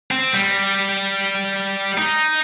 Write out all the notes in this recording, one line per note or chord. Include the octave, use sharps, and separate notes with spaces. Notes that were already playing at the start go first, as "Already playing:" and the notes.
C4
G3
D#4